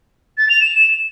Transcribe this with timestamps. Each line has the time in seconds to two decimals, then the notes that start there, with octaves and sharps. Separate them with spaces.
0.38 A6
0.49 F7
0.61 E7